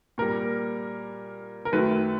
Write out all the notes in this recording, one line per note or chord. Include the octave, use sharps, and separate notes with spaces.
A#2 G3 A#4
A#4
F#2 D#3 F#3 A3 B4